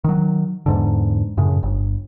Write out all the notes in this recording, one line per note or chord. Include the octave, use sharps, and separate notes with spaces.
D#3 F#3
E2 G#2 D3
F#2 A2 C#3
G1